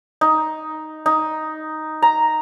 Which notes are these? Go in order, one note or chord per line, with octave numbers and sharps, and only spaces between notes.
D#4
D#4
A#5